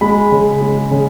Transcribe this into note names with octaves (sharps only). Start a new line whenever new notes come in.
G#3 B5
C#3
G#3
C#3